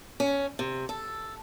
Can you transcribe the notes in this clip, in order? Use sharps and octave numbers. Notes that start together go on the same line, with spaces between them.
C#4
C3
A4